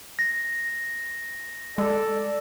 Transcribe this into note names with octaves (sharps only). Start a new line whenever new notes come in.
A#6
G#3 A4 D5